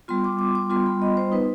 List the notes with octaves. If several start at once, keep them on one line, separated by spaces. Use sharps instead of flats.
G3 B3 F4 C6
D6
D6
D6
G3 B3 F4 C6
B5
D#5
C5
B3 D#4 B4